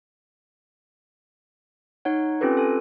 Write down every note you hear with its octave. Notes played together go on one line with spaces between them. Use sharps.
D#4 C#5 F#5
C4 C#4 F4 G4 A4 B4
A4 G#5